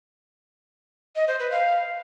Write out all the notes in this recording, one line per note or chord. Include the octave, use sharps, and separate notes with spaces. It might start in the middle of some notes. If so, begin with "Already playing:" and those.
D#5
C5
B4
F5